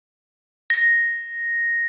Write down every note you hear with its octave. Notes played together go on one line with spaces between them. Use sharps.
A#6